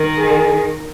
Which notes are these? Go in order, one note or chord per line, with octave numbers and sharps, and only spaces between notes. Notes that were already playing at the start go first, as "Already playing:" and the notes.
Already playing: D#3
G#4